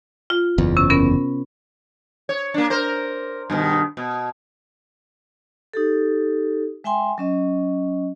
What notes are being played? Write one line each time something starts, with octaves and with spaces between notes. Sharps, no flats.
F4
F#1 E2
C3 C#4
B3 C#4 A#4
C#5
A#3 D4
A#4 C5
G2 B2 D#3
B2
D#4 G4 A4
G#3 E5 G5 G#5 C6
F#3 C#4 D#5